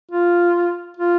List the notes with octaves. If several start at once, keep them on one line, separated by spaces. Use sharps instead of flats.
F4
F4